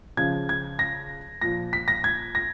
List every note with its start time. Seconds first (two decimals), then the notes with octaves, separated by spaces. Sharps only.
0.17 C#3 F3 G#6
0.49 G#6
0.79 A#6
1.41 A#2 F3 A#6
1.73 B6
1.88 A#6
2.04 G#6
2.35 A#6